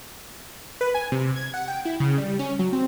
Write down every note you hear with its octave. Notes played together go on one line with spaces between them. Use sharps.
B4
G#5
C3
G#6
F#5
G5
E4
C#3
G3
C#4
F#3
C4